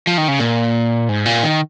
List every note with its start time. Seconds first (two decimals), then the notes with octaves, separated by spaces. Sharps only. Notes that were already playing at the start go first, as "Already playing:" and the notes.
0.07 F3
0.18 D#3
0.28 C#3
0.39 A#2
1.09 G#2
1.26 A#2
1.43 D#3